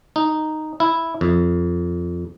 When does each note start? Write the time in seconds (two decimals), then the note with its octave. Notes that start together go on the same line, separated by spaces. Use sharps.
0.16 D#4
0.80 E4
1.21 F2